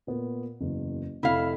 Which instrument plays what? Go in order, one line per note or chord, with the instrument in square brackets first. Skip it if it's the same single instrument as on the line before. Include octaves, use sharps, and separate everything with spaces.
[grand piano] A#2 B3
F#1 E2
[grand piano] F1 [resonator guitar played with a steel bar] E4 F5